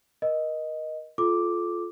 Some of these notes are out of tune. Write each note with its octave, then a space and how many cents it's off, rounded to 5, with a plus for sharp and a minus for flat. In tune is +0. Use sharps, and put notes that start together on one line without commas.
A#4 +35 D#5 +0
F4 +0 A4 -30 D6 +0